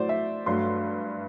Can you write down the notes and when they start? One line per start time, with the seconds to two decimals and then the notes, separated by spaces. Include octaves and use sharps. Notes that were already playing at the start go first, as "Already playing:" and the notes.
Already playing: A2 F#3 A3 C5 D5
0.09 E5
0.46 G2 F#3 A3 C6